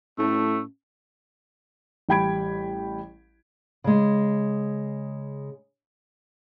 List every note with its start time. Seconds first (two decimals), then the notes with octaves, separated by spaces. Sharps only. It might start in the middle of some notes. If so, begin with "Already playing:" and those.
0.19 A2 A3 C#4
2.09 A1 G3 G5 B5 G#6 D7
3.84 C#3 G#3